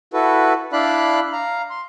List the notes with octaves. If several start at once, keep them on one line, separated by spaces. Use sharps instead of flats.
E4 F#4 A4 B4
D4 E4 D5 F5 B5 F#6
F5 A#5
C6